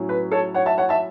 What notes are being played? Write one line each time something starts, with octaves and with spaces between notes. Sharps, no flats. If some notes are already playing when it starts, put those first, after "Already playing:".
Already playing: A2 F#3 C#4
B4
A4 C#5
C#5 F#5
E5 A5
C#5 F#5
E5 A5